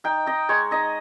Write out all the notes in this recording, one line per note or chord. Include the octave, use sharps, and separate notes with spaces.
D#4 G5
D#4 D#5
G#3 C#5
D#4 D#5